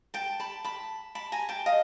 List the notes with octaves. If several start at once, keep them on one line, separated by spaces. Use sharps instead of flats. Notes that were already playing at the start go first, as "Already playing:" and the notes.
G5 A5
A5 B5
A5 B5
A5 B5
G#5 A#5
G5 A5
D#5 F5